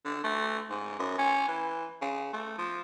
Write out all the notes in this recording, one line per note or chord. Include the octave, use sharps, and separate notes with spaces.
D3
A3
G#2
F#2
C#4
E3
C#3
A3
F3